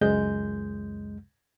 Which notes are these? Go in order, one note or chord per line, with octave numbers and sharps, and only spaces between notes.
C#2 F#2 G#3 G6